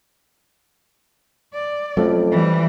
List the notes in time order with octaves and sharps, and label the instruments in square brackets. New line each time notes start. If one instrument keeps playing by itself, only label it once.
[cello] D5
[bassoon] F2 [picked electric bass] F#3 A3 C#4
[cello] E3 G3